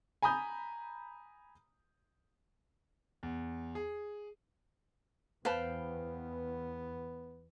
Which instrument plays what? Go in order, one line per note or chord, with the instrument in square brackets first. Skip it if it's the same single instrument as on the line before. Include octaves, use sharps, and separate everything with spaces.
[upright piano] G#5 A#5 B5 D#6 G6
[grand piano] E2
G#4
[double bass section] E2 [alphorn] B3 [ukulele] B4 C5 A5 [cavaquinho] F5 G5 B5